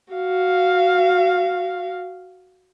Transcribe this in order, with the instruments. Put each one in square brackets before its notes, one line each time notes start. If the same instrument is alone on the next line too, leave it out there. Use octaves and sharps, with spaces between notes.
[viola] F#4 F5